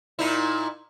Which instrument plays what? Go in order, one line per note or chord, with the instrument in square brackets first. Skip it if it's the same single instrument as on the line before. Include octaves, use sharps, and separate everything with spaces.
[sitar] A#2 D#4 E4